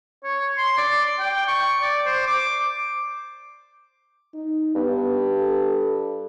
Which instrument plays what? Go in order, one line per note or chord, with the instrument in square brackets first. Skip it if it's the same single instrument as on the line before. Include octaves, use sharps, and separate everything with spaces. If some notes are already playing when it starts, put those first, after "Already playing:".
[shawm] C#5
C6
D5
G5
C#6
D5
C5
D6
[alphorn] D#4
[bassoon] G2 [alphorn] B3
[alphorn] A4